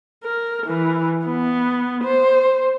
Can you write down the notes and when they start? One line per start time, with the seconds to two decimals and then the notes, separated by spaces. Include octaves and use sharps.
0.24 A#4
0.66 E3
1.26 B3
2.04 C5